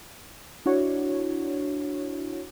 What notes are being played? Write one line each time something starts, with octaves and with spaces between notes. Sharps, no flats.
D4 E4 F#4 C#5